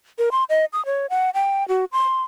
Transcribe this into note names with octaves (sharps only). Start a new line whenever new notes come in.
A#4
C6
D#5
D#6
C#5
F#5
G5
F#4
C6